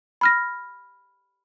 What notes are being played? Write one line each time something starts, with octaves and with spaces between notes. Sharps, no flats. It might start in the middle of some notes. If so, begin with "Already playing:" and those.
B5 F6 A#6